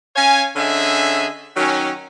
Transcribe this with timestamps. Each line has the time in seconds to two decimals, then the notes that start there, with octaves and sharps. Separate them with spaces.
0.16 C#4 C#5 F5 G#5
0.56 D3 C#4 G#4 D#5 E5
1.57 D#3 F#3 C#4